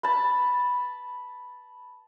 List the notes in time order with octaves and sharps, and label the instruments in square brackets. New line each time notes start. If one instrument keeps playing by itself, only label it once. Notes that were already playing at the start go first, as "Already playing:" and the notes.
[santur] A5 B5